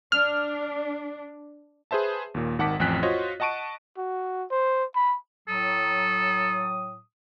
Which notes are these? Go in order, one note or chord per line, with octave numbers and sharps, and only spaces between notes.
D4 F6
G#4 B4 C5 E5 A5
D#2 A#2
G#1 D#3 F#5 A5 D6 B6
A1 F2 G5 G#5 F#6 B6
F4 F#4 C5 C#5 D#5
D#5 F#5 A5 C#6 D7 D#7
F#4
C5
B5
A2 F#3 A4 D#6